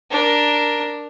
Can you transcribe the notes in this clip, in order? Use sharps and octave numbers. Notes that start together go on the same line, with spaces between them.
D4 A#4